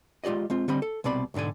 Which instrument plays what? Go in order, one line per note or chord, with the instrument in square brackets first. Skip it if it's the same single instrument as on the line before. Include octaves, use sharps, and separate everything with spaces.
[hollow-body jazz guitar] G#3 F4 G4 D5 D#5
G#3 C4 F4
D3 G3 C4 D#5 B5
A4
C2 B2 C4 D5 B5
B1 G#2 D3 D5 G#5